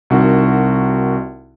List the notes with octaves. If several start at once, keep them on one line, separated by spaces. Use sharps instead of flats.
C2 D#3 F#4